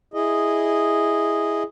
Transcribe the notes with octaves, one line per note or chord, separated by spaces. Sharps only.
E4 G#4 D#5